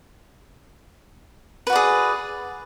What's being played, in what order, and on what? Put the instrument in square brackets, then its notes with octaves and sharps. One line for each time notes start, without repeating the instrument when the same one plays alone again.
[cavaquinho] B4
F#4
D5
G#4